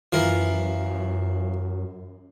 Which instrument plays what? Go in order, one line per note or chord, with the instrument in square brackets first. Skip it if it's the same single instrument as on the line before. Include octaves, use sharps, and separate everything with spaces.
[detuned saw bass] F#2 [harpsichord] E3 F3 A#4